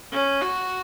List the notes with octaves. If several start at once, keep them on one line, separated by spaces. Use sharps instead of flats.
C#4
F#4